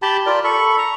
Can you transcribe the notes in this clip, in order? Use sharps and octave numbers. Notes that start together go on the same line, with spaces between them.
G4 G5 A5 B5
F4 A#4 D5
A4 B5 C#6
A#5 C#6